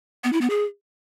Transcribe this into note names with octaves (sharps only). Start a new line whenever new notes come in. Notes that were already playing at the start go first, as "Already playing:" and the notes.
B3
E4
B3
G#4